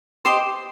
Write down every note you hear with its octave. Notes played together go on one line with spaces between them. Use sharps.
G4 C5 D#5 C6